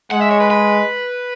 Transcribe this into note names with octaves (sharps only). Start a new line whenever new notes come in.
G#3 F#5
E5
C#5
B4
B4